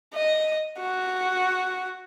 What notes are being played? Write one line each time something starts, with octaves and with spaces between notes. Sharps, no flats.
D#5
F#4